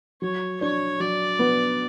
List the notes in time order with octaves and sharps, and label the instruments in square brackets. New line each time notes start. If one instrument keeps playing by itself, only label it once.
[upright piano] F#3 [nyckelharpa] C#5
[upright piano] D4 [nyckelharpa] C#5
[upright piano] F#3 [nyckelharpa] D5
[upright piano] B3